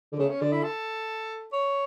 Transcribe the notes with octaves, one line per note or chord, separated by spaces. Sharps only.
D3
C#3 A3
C#4
D3 D4
E4
A4
C#5